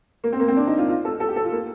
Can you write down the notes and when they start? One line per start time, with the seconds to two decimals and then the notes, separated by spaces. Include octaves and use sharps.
0.24 A#3
0.32 C4
0.40 A#3
0.48 C4
0.56 D4
0.67 D#4
0.78 F4
0.88 F4
1.05 A4
1.20 A4
1.29 G4
1.36 A4
1.44 F4
1.52 A#3